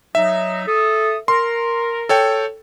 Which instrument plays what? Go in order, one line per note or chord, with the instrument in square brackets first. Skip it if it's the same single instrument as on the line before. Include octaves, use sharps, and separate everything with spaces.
[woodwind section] F#3 D#4 [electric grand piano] E5
[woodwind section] A4 D#6
[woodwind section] A#4 [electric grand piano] C6
[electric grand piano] A4 C#5 G5